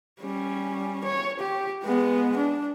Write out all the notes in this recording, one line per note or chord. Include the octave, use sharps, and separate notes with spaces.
G3 C#4
C#5
G4
G#3 B3
D4